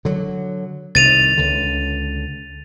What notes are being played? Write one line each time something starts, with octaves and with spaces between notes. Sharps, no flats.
D3 F#3
C2 D#3 A6 D#7 F7
C#2 D3